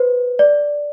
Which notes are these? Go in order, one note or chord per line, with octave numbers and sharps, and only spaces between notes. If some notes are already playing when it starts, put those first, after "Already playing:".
Already playing: B4 C5
D5